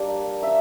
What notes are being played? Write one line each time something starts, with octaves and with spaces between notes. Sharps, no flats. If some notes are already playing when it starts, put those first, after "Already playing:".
Already playing: G3 A#3 D4
E5